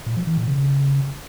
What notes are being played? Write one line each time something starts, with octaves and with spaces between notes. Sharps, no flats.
A#2
F3
E3
A#2
C#3